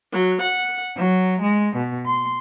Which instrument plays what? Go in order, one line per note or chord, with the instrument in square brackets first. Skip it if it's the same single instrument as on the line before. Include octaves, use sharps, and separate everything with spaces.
[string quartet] F#3
F#5
F#3
G#3
B2
C6